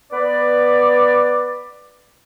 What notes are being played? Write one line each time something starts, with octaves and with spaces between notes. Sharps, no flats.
B3 B4 D5